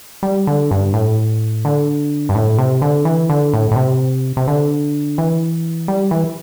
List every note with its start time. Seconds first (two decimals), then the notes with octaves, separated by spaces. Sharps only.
0.23 G3
0.47 D3
0.71 G2
0.94 A2
1.65 D3
2.29 G2
2.35 A2
2.58 C3
2.82 D3
3.05 E3
3.29 D3
3.53 A2
3.71 A2
3.76 C3
4.37 C3
4.48 D3
5.18 E3
5.88 G3
6.11 E3